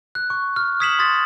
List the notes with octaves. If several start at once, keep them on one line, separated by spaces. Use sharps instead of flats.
F#6
C#6
F6
D#6 G#6 B6 C#7 E7 F#7
C6 D#6 G#6 A6 B6